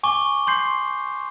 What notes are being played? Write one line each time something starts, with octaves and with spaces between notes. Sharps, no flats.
G#5 C#6 D6 G7
C6 G6 C7